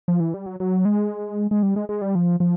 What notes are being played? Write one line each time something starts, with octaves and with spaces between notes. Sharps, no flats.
F3
E3
G3
F#3
F#3
G#3
G#3
G3
G#3
G#3
G3
F3
F3